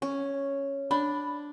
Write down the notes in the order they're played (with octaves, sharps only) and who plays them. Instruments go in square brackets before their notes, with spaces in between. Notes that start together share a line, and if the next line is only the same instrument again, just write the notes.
[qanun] C#4
[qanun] D4 [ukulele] B5